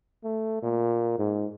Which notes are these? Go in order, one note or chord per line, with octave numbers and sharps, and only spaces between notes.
A3
A#2
G#2